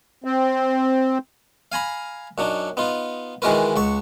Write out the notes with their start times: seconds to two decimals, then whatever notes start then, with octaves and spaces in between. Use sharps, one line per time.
0.24 C4
1.72 F5 G#5 A#5 B5
2.38 F#2 F#3 D4 D#4
2.77 B3 D#4 F4
3.42 D#3 E3 G#3 F#4 A#4 B4
3.76 C#2 F#5 C#6